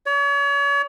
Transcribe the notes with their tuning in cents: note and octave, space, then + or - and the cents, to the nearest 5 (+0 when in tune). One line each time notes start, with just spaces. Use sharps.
C#5 +40